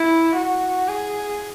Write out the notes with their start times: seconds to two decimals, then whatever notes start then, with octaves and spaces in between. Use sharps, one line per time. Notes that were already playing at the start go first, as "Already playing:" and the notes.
Already playing: E4
0.35 F#4
0.88 G#4